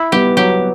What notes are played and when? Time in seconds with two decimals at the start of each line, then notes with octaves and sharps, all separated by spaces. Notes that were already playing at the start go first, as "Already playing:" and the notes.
Already playing: E4
0.12 G3 B3 G4
0.37 F#3 G4